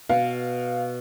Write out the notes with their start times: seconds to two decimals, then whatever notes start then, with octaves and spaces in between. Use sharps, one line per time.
0.09 B2 F5